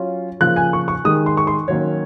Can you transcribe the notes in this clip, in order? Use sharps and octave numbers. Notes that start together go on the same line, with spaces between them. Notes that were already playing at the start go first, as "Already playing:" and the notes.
Already playing: F#3 C#4 F4
C#3 F3 A#3 F4 F#6
G#5
C#6
C#6
D#3 G#3 D#4 D#6
C6
C#6
C6
D#3 F#3 A#3 C#4 C#5